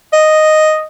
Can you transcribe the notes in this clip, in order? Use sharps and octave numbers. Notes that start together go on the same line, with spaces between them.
D#5